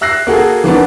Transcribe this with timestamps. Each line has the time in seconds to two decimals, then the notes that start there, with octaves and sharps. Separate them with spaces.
0.01 E5 E6 F#6 A#6 C7
0.27 A#3 F#4 G#4 A4
0.64 E3 A#3 B3 D4